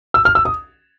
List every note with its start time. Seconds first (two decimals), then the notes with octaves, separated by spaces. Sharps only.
0.14 E6
0.25 F6
0.35 E6
0.45 D#6